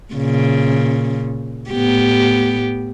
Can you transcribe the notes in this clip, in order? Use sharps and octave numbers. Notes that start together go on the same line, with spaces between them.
A#2 C#3
A2 B3 G4